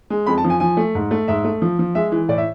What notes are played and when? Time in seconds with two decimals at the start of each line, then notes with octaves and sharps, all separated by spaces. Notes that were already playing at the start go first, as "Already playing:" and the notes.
0.10 G#3
0.26 F2 B5
0.38 A5
0.44 F3
0.50 G#5
0.60 F3 G#5
0.77 A3
0.95 G#2
1.11 A3
1.28 G#2 E5
1.44 A3
1.62 F3
1.79 F3
1.95 G#3 E5
2.12 E3
2.29 A2 D5
2.38 E5